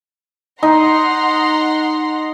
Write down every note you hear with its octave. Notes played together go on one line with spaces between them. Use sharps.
D#4 F#5 A#5 C6